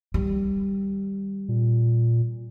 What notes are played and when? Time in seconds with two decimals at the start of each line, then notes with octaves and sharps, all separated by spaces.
0.14 D#3 G3
1.49 A#2